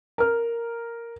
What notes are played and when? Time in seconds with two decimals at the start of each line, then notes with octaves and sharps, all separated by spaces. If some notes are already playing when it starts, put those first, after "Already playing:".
0.18 A#4 F6